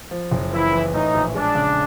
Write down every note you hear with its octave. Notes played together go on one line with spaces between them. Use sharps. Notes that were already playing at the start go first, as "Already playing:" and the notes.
F3
F#1
E3 E4
E3
A2 D#4
A#1
G#3 D4
C#3